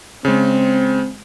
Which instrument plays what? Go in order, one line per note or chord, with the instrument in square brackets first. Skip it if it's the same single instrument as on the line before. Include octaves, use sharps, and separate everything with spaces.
[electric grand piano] C#3 G#3 [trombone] C4